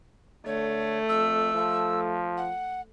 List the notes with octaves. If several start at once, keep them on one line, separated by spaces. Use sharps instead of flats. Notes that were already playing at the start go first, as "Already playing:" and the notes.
D3 A3 C#5
F2 E6
F3
F#5